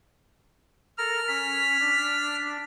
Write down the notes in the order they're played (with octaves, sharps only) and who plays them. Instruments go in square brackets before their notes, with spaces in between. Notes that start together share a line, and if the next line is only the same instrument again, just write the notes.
[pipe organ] A4 A#4 A#5 [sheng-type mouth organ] F6
[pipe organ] C#4 [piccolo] B6
[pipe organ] D4